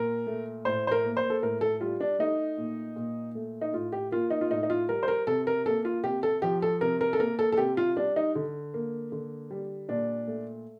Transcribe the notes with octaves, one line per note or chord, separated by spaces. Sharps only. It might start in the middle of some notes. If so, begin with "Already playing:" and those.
Already playing: A#2 A#4
A3
A2 C5
C5
A#4
A#3
C5
A4
A2 A#4
A4
G3 F4
D4
A3 D#4
A#2
A#2
A3
D#4
A2 F4
G4
A#3 F4
D#4
F4
A2 D#4
D#4
F4
G3 A#4
C5
A#4
C3 A4
A#4
A#3 A4
F4
C3 G4
A4
F3 G4
A4
C3 A#4
A#4
A4
A#3 A#4
A4
A4
C3 G4
F4
G3 D4
D#4
D3
A#3
D3
G3
A#2 D4
A3